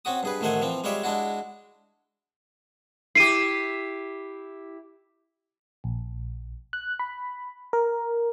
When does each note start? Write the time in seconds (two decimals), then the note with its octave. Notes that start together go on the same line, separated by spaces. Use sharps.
0.05 C4 C#4 F#4 D#6
0.23 G2 G#4 B4
0.41 A1 D#3 A3 C5 F#5 G#5
0.61 E3 F3 C4
0.84 G3 G#3 F4 C#5 D5 E5
1.03 G#3 D4 E4 F#4
3.15 E4 G4 C7 D#7
5.84 A#1
6.73 F#6
7.00 B5
7.73 A#4